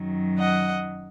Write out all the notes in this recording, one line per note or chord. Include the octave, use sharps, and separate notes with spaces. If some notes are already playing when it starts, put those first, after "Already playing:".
Already playing: F#2 D#3 F#3
D#5 F#5